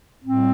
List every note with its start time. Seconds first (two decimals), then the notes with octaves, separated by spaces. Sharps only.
0.24 A2 G3 C4